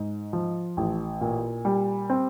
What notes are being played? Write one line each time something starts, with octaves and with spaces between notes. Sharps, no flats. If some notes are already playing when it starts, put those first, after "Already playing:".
Already playing: G#2
F3
A1
A#2
G3
C4